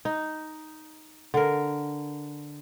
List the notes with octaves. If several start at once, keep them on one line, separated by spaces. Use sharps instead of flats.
D#4
D3 A#4